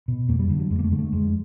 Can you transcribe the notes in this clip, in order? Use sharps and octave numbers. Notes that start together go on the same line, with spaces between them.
B2
F2 A#3
G3
D3 G3
F#3
F2 G#3
A#3
A3
D3 G#3
A3
F2 G#3